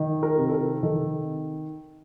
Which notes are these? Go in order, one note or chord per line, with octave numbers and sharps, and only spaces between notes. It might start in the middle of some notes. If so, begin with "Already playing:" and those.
Already playing: D#3
A#4
C3
A4
A#4
D#3 A4